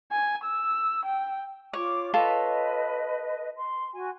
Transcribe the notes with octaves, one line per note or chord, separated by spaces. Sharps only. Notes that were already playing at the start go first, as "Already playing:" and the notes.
G#5
E6
G5
F4 C#5 D6
F4 A4 B4 C#5 D#5
C6
F#4 G#5